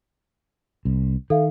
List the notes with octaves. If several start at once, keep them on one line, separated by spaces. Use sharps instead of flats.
C2
D#3 A4 E5 F5